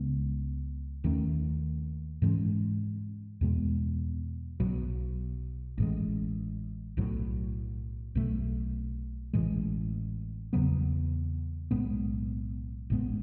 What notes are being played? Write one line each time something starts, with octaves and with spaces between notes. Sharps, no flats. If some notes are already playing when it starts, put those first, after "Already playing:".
Already playing: C#2 C#3 G#3 B3
D#2 D#3 A3 C#4
G#2 E3 G#3 C#4
E2 B2 G#3 B3
B1 B2 F#3
A1 A2 E3 G#3
B1 A2 F#3
B1 B2 A3
A1 A2 E3 G#3
E2 C#3 F#3 B3
B1 A2 G#3 B3
A1 A2 G#3 B3